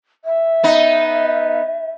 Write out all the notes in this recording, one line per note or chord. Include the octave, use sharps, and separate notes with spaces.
E5
B3 D#4